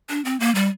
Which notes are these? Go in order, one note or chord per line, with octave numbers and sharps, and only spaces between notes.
D4
C4
A#3
G3